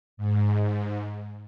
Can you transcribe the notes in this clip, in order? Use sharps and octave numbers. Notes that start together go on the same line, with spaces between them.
G#2